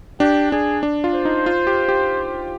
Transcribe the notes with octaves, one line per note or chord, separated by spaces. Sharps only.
D4 G4
D4 G#4
D4
F4
C5
D#4
F4
G4
G4